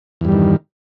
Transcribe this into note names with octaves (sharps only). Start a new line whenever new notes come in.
E2 G2 D#3 G3